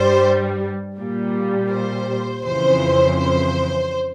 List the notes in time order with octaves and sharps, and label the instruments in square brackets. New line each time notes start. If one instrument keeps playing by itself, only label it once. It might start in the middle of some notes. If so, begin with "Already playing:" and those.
Already playing: [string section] G2 G3 C5
A#2 G3
C5
F2 C#3 E3 C5
C5